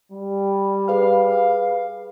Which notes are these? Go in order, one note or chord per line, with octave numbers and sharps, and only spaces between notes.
G3
G#4 B4 F5 F6